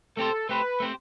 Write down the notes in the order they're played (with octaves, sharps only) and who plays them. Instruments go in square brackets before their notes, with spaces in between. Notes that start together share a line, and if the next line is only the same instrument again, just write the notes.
[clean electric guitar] A3 C4 G4 C5 [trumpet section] A4
[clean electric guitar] A3 C4 G4 C5 [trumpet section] B4
[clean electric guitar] A3 C4 G4 C5